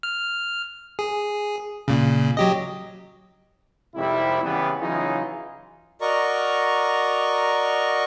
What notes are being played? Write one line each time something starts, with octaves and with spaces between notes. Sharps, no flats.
F6
G#4
A#2 C#3
F#3 G4 D#5
G#1 F2 C3 G3 E4
C#3 E3 G3 B3
C#3 E3 F#3 D#4 F4 G#4
F#4 A#4 D5 D#5 A#5 C#6